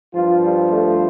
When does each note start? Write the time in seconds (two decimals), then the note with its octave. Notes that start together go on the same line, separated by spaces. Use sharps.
0.14 G2 F3 F4
0.43 G3
0.70 A3